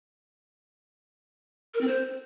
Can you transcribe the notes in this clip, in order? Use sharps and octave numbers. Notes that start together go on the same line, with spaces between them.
A#4
C4
C5